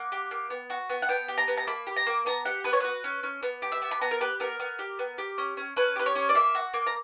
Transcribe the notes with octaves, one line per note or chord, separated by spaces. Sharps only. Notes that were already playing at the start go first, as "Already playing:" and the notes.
Already playing: A#3 F#5
G4
A#3
B3
F#4
B3
F#5
B3 G5
G4
A#5
B3
A#5
A#3 B5
G4
A#5
A#3
B3 A#5
G4 F#5
B3 B4
C#5
F#4 B4
C#4
C#4
B3
G4
E5
B3
B5
B3 A#5
A#4
G4 B4
B3 A#4
B3
G4
B3
G4
C#4
C#4
C#4 B4
G4 B4
C#5
C#4
D5
A#3 E5
F#4
A#3
A#5